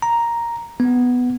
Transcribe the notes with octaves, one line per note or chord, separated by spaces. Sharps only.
A#5
B3